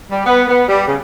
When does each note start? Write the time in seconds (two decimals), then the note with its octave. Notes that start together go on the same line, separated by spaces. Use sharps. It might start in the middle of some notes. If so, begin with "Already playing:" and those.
0.10 G3
0.25 B3
0.48 B3
0.69 G3
0.87 C#3